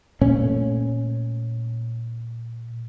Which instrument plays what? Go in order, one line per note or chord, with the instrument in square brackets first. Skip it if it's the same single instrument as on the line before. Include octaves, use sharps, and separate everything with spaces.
[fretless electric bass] A#2 A3 C#4